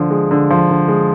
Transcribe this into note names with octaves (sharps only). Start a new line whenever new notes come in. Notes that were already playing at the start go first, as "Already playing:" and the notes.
Already playing: D3 F3
G#3
D3
F3
D3
G#3